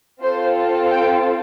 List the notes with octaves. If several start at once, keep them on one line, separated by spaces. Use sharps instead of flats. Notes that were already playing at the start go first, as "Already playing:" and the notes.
C4 F4 A4 C5
G5